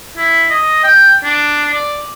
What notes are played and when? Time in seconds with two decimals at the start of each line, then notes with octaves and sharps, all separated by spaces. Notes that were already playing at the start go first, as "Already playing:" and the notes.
0.17 E4
0.50 D#5
0.83 G5
1.24 D4
1.74 D5